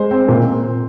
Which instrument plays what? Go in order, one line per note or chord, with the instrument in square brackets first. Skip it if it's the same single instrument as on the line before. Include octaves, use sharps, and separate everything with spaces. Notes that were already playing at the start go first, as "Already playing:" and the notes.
Already playing: [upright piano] G#3 C5
C4
A#2